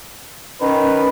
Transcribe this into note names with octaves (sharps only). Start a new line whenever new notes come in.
D#3 C#4 B4